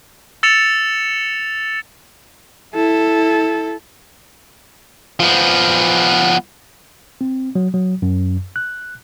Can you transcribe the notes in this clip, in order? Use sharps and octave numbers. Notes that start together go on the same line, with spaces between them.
E6 A6 C#7 E7 F7
E4 A4
F3 B3
C4
F#3
F#3
F#2
F#6